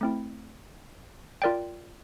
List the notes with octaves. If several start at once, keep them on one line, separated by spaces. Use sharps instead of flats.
A3 C4 E4
F4 A#4 D5 G5